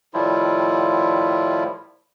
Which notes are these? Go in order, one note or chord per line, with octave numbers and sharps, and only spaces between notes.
A2 D#3 F3 G3 E4 F4